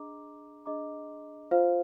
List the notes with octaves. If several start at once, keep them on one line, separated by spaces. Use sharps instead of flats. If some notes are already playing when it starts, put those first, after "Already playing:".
Already playing: D4 G#4 D#5 A#5 D6
D4 G#4 D#5 A#5 D6
F4 C5 F5